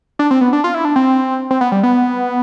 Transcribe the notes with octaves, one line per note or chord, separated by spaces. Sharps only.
D4
C4
B3
D4
F4
E4
D4
C4
C4
B3
G3
B3